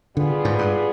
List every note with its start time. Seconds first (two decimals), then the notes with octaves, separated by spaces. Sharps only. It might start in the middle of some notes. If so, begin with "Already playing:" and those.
0.16 D3 G3 B3 F4 G#4
0.45 G#2
0.59 G2